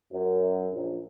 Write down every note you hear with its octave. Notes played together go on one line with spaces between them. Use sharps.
F#2
A#1